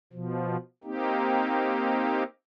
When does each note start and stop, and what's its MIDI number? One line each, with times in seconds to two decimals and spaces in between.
0.13 0.57 47
0.13 0.57 53
0.84 2.23 58
0.84 2.23 60
0.84 2.23 63
0.84 2.23 67